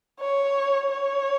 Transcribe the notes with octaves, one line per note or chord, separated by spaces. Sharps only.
C#5
C#5